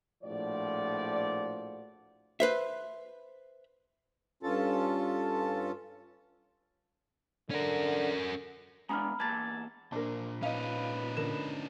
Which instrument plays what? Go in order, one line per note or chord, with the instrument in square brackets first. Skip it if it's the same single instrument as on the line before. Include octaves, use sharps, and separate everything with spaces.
[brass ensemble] A#1 A2 F3 F#4 D5
[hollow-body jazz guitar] B4 C5 E5
[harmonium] G2 C#4 F4 A4 A5
[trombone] D3 [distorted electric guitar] C#4 A#4
[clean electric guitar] G#3 B3 D4 [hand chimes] A#5 B5 F6
[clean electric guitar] E2 A#3 A5 [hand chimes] G#6 A6
[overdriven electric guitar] A#2 C5 [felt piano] D4 A#4
[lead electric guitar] C#4 D#4 [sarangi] B4 [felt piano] D#5 F5
[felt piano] D3 A#4 E7